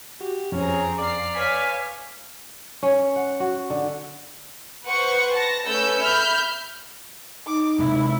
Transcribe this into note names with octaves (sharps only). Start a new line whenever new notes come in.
F#4 G4
F2 C4 C#4 G#4 A#5
D5 F5 A#5 C7
B4 C#5 F5 G#5 B6
C#4
F#5
F#4
D3
B4 C5 F#5 C#6
A5 A#6
A3 C#4 B4 E6 G6
E5 B5 F6 G6
D#4 D6
C3 G#3 E4